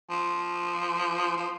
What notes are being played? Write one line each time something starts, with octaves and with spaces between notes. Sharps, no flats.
F3
F3